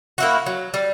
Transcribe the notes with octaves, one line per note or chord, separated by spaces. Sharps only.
A#3 E4 F#4
F#3
G3